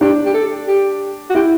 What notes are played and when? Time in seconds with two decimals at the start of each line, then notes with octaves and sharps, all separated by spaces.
0.01 D4 G4
0.25 G4
0.34 A4
0.68 G4
1.30 F#4
1.35 E4 G4